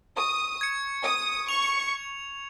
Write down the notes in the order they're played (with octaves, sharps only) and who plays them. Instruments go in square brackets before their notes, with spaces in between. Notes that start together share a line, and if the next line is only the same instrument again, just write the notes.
[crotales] C#6 [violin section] D#6
[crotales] G#6 C#7
[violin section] D#6 [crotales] G#6
[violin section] C#6 [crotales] F7